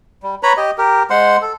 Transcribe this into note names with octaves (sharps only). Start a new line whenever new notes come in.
G3
B4 C#5 A#5 B5
G4 D#5
G4 A#4
G#3 C5 F#5 C6
A4